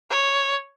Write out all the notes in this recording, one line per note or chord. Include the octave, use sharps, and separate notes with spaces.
C#5